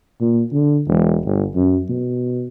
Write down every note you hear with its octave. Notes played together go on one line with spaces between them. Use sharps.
A#2
D3
E1
G1
F#2
B2